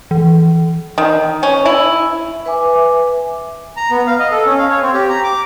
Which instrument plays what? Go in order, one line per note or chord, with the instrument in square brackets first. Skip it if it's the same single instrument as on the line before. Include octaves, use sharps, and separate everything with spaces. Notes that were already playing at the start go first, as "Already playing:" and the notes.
[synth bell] E3
[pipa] D#3
C#4
E4
[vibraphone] B4 E5 G#5 D6
[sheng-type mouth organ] A#5
B3
F5
D#5
A4
C#4
F5
C#5
C4
G4
A#5
D6